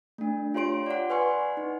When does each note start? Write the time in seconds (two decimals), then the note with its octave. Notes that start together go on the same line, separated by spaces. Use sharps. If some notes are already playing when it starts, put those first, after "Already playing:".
0.18 A3 D4
0.54 F4 G4 C#5 C6 D7
0.86 D5 F#5
1.10 B4 F#5 G#5 C6 C#6
1.57 D#4